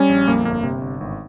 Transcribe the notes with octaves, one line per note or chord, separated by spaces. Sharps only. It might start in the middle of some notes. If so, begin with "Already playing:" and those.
Already playing: G3 C#4
A#1
F2 A#3
G1 A#3
C3
G1
G#1